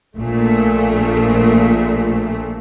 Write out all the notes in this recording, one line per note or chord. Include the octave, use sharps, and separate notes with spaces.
A#1 A#2 A3